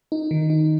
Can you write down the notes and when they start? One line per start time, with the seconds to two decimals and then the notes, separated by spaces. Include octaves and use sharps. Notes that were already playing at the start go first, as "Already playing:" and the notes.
0.12 D#4
0.31 D#3
0.50 D#4